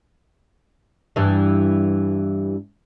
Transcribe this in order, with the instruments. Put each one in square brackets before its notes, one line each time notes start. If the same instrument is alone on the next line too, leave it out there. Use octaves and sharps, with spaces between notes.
[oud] G2 E3